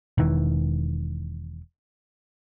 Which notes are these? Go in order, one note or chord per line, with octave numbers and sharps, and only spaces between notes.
E1 D#3 E3